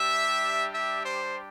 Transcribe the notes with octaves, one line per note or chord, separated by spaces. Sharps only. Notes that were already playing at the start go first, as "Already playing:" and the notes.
Already playing: G3 D4 G4 E5
E5
C5